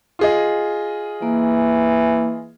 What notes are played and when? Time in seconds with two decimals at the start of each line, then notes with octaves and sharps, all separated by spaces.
0.19 F4 G#4 D#5
1.22 E3 A#3